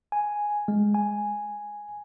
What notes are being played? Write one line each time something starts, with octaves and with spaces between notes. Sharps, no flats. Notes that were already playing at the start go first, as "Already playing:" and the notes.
G#5
G#3
G#5